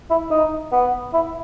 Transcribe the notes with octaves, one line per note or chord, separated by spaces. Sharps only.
E4
D#4
B3
E4